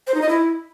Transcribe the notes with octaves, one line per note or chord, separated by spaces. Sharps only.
C5
D#4
D#5
E4